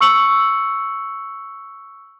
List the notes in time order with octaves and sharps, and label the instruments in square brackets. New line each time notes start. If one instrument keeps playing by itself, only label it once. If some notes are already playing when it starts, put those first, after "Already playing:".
[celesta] C#6 E6 C#7 F#7